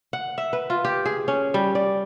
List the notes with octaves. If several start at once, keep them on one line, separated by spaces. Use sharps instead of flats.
F#5
E5
B4
F4
G4
G#4
C#4
G3
D5